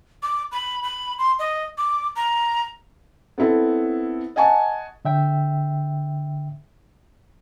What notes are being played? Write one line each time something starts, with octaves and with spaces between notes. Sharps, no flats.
D6
B5
B5
C6
D#5
D6
A#5
B3 C4 E4 A4
D#5 F#5 G#5 A5 C#6
D3 E5 G5